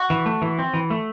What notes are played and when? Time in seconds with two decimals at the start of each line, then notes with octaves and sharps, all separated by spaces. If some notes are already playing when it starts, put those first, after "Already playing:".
Already playing: F#4
0.10 E3
0.26 A3
0.42 E3
0.59 C4
0.74 E3
0.90 A3